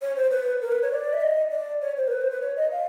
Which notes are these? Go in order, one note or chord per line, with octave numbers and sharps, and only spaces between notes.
C#5
C5
B4
A#4
B4
C#5
D5
E5
D#5
D5
C#5
C5
A#4
B4
C5
B4
C#5
D#5
F5